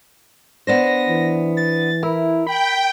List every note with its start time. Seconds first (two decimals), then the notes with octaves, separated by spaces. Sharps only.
0.67 B3 D4 C5 A#6
1.09 E3
1.57 A6
2.03 E4 A#4
2.47 G5 B5